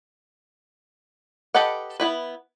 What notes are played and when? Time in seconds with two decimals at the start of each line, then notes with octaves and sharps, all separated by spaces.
1.54 G4 A4 B4 D#5 F#5
2.00 B3 E4 B4